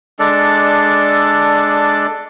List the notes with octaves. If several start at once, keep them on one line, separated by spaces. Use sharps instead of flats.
G#3 D4 A4 D5